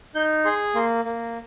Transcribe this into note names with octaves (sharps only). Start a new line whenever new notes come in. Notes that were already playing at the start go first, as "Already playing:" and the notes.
D#4 G6
G#4 C6
A#3 C6
A#3